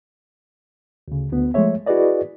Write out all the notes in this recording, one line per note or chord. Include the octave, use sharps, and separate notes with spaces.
D2 C#3
D2 B3
F3 G#3 A3 C#5 E5
E4 F#4 G#4 B4 D5 D#5